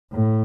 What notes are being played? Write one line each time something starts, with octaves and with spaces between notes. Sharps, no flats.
A2